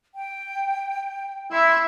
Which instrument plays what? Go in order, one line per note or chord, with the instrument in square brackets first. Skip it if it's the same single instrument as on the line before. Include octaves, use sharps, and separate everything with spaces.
[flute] G5
[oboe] E4 [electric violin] E5 C6